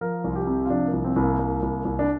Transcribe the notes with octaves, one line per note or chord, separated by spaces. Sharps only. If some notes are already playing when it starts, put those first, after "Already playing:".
F3 A#4
C2
F4
G4
C3
F4
F3 D4
A#3
C2
C4
C2
A#3
C2
C2
C2
D4